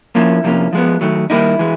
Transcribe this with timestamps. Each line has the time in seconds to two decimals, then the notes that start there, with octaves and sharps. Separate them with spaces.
0.15 F3 A#3 C#4 E4
0.44 C3 F3 A#3 C#4
0.73 F3 G#3 B3
1.01 D#3 F#3 A3
1.30 D#3 G3 A#3 D#4 E4
1.59 E3 G#3